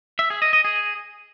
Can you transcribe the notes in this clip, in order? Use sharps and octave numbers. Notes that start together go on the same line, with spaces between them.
E5
G#4
D#5
D#5
G#4